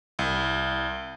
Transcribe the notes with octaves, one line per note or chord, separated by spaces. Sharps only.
C2